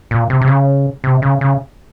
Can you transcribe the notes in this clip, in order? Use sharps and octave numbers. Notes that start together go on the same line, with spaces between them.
A#2
C3
C3
C#3
C3
C#3
C#3